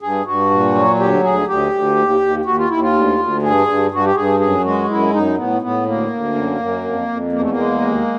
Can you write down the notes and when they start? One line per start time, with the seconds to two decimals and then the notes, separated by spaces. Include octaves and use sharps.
0.01 G2 G#4
0.26 G2 F#4
0.50 A#2
0.74 F#3
0.99 D2 G4
1.23 D2 G#4
1.48 D2 G4
1.73 D2
1.96 D#2
2.21 D#2
2.45 D#2 F#4
2.58 F4
2.69 D#2 E4
2.82 F4
2.93 D2
3.19 D2
3.42 G2 G#4
3.67 G2
3.91 G2 F#4
4.05 G4
4.15 G2 G#4
4.40 F#2 G#4
4.64 G#3 F#4
4.89 F#2 E4
5.13 F#2 D#4
5.37 A2 B3
5.62 A2 B3
5.86 D2 A#3
6.10 D2
6.35 F#2
6.59 F#2
6.84 F2
7.08 F2
7.32 E2 A#3
7.41 A3
7.50 A#3
7.57 G#3
7.81 D#2